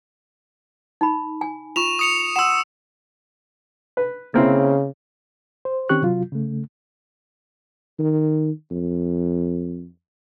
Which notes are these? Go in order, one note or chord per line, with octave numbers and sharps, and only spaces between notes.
D#4 B5
G#5
F4 C#6 E7 F7
D#6 C#7 F7
F#5 C6 E6 E7
B4
C#3 A#3 C4 E4
C5
D#3 C4 C#4 G4 C#6 F#6
C3 F#3 F4
C#3 A3
D#3
F2